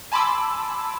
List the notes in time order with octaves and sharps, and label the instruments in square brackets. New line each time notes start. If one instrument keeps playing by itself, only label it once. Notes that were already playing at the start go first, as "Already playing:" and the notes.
[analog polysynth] G#5 A5 B5 C6 D6 E6